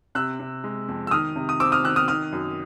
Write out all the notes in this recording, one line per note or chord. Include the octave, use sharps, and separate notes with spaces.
C3 E6 F#6
C3
G#3
F2
E6
D#3 D#6 F6
C3
D#6
C4 D6 E6
D#6 F6
D#3 E6 F#6
D#6 F6
D#3 D#6 F6
F#2